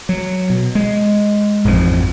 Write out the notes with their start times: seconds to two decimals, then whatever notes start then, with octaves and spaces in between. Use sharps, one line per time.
0.09 F#3
0.50 B2
0.75 G#3
1.65 A1 F2 G#2 F3